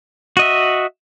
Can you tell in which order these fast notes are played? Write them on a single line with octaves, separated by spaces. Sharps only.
F#4 D#5 E5